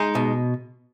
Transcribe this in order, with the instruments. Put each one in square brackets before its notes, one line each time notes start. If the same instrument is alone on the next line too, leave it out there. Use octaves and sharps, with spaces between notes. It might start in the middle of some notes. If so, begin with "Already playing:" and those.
Already playing: [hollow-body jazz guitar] G#3 D#4
B2